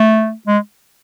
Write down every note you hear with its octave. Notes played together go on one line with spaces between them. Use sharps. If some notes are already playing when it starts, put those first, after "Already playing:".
Already playing: A3
G#3